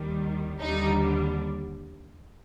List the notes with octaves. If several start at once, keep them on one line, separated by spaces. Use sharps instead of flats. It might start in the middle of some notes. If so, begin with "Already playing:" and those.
Already playing: D#2 D#3 G3
D#2 D3 G3 D#4